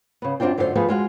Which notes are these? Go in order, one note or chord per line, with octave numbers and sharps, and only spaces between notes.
C#3 B3
F#2 C4 D4 F4 G5
F#2 D3 A3 F4 F#4 C5
F3 A3 B3 G#4 B4 D#5
G#3 F4 F#4